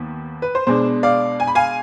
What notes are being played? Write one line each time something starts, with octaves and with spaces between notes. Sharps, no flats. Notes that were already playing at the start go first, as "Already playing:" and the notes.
Already playing: D#2 D#3 B3
B4
C5
B2 G#3 D4 C5
D5 F5
G#5
B5
F5 G#5